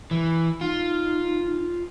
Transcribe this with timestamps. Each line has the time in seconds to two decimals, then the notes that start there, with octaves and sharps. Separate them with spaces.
0.11 E3
0.61 D#4 F4